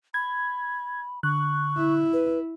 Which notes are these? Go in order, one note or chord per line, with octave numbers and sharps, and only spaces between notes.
B5 G#6
D3 C#6 F#6
E4
B4